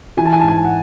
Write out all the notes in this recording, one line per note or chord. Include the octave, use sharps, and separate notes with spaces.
E3 G#5
A5
G#5
A5
G#2
G#5
F#5